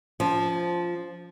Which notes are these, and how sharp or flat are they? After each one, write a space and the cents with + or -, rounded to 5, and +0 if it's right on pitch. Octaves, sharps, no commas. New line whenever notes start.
F3 +0 C#4 +45